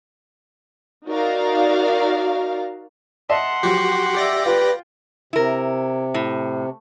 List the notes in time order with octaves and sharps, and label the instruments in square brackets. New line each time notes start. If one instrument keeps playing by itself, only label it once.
[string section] D#4 F#4 A#4 D5 F5
[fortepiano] D#5 E5 A5 [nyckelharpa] F#5 C6
[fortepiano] F3 F#3 [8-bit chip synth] F#4 G4
[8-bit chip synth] G4 D5 A#6 [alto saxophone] E5
[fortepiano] F4 G5 [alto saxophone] B4
[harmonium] C3 [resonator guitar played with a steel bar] E4 A#4
[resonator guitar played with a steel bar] A2